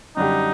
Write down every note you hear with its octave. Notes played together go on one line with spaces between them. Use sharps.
F#2 D3 G3 D4 D#4 G4